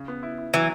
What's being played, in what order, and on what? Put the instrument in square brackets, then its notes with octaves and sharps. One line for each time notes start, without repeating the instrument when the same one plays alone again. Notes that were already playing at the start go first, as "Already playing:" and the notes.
Already playing: [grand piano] C#3
B3
E4
E4
[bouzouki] E3 [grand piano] F#3